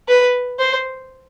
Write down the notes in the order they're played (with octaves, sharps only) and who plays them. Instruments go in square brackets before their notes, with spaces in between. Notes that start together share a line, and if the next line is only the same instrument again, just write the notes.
[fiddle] B4
C5